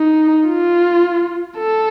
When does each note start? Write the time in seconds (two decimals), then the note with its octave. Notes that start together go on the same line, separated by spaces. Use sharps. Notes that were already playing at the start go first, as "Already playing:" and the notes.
Already playing: D#4
0.49 F4
1.58 A4